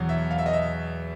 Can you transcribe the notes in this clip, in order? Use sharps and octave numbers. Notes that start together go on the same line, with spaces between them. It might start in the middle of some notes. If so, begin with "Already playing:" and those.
Already playing: E2 B2 F#3
E5
F5
E5
D#5
E5